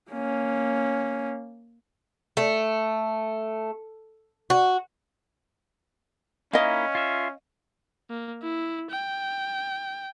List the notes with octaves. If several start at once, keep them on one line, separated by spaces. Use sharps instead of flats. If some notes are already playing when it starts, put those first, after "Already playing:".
A#3 C#4
A3
F#4
A#3 C#4 D#4 E4 D#5 F5
F4 E5
A#3
E4
G5